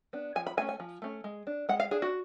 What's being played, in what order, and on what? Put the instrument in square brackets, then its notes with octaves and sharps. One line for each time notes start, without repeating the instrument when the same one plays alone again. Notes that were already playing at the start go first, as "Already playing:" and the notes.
[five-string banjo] B3 D4
F3 G#5
B5
A3 G#5
C#4
G#5
F3
A3 C#4
G#3
D4
G#3 F#5
F5
D4 G#4
F#4